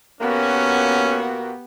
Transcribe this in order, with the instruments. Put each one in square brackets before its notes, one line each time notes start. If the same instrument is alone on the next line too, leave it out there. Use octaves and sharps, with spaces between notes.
[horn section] A#2 A#3 F#4 [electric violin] B3 G4 [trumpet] C#4